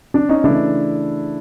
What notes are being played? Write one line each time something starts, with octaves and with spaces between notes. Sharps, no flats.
D4
C#4 D#4
C#3 E3 A3 D4 E4